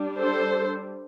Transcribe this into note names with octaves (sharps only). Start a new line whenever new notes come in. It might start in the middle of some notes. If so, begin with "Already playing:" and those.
Already playing: G3 D4
A4 C5